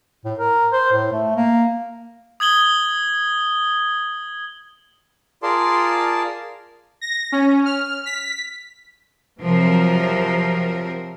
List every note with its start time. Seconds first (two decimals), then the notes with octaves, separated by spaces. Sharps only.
0.25 A2
0.39 A#4
0.72 C5
0.93 A2
1.13 A3
1.36 A#3
2.40 D#6 G#6 F#7 G7
5.43 F4 G#4 A#4 D5 A5 C6
7.01 A#6
7.32 C#4
7.66 F6
8.06 B6
9.42 C3 F3 F#3 A#4